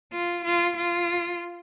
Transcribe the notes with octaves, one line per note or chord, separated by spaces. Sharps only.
F4
F4
F4